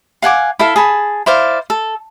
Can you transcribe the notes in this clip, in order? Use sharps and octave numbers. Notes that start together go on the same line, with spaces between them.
F5 F#5 G#5 D6
E4 A4 E5 F5
G#4 A5 B5
E4 C5 D5 F5
A4